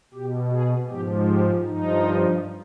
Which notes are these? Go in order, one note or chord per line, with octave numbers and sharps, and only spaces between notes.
B2 G4
G#4
G#2 F3 G4
G4
G2 F3 D#4